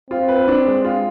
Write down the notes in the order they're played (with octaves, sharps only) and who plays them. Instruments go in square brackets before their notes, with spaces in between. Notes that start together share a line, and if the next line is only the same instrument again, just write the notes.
[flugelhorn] C4 [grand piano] F4
[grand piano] B4
D4
G#3
F4